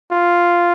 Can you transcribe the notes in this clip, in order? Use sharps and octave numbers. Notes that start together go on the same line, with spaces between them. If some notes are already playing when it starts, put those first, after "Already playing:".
F4